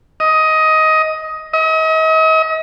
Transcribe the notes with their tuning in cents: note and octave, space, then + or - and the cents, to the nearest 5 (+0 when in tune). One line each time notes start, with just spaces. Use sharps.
D#5 +15
D#5 +40